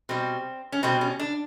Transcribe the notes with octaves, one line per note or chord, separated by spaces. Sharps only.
B2 G3 C4
C#4
B2 G3 C4
C#4
D4